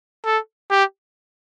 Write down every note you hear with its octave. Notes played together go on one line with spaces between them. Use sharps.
A4
G4